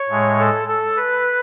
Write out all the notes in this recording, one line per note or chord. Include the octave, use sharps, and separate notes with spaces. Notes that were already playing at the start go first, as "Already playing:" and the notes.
Already playing: C#5
A2 G#3
A4
A4
B4